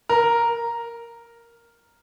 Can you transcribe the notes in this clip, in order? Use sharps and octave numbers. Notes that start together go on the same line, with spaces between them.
A#4